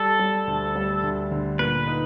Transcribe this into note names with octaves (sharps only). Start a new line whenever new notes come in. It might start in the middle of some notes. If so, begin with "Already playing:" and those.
Already playing: G3 A4
G3
D2
G3
D2
D3
A#2 B4
D#4